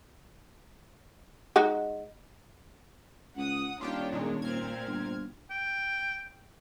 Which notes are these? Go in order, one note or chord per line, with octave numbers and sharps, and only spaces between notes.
G#3 D#4 F#4
C#2 F#5 D#6
D#1 D#3 D4 F4 G4 C#5 G5
A#2 G#3
A#2 C4 F6 G#6
G1
G5